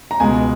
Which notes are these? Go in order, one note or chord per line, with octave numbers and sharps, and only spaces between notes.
A#5
C#2 B2 G#3 G#5